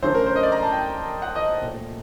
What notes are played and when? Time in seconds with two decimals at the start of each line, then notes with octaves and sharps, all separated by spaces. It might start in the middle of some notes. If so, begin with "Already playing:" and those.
0.02 F#2 D3 A3 C5
0.15 A#4
0.27 C5
0.36 D#5
0.43 D5
0.52 A#5
0.63 A5
0.72 G5
1.22 F#5
1.36 D#5
1.62 A#2 A3